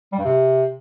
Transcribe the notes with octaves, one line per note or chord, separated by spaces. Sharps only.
G3
G2
C3